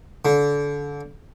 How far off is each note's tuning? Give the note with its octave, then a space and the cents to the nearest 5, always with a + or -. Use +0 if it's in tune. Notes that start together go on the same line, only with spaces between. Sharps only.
D3 -30